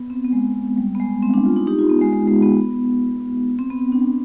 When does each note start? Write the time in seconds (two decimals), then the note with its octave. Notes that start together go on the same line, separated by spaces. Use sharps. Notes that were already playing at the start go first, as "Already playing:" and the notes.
Already playing: B3
0.10 C4
0.24 B3
0.33 G#3
0.78 G3
0.95 B3
1.00 G#3
1.23 C4
1.34 D4
1.45 F4
1.56 D#4
1.67 D#4 G4
1.79 F4
1.89 B3
2.01 G#3
2.13 G#3
2.27 G#3
2.43 B3
3.59 C4
3.70 B3
3.92 D4